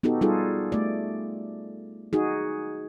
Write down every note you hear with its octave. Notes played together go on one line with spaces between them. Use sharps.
B3 D#4 F#4 G4 A4
G3 D#4 F4 G#4 A4
A3 D5
D#4 F#4 G#4